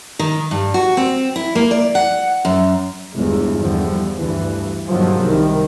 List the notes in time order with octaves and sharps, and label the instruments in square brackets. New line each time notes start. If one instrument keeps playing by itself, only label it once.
[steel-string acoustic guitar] D#3
G2
F#4
C4
E4
A#3
D5
F#5
F#2
[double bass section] G1 E2 G#3
E2 D3 F3 G3
D2 G2 E3
G2 A#2 D#3 F3 F#3 G#3
C2 C3 D#3 G3